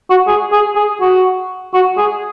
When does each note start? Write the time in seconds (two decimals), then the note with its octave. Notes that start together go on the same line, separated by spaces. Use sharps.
0.10 F#4
0.27 G#4
0.52 G#4
0.76 G#4
1.01 F#4
1.74 F#4
1.98 G#4